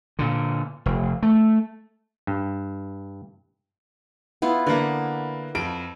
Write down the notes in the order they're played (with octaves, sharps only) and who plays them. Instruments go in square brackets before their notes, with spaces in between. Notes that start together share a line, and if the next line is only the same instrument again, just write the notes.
[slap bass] A#2 D3
F1
A3
[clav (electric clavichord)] G2
[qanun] B3 E4 F4
[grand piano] D3 A#3 [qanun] B4 F#5
[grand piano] F2 D7 [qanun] A4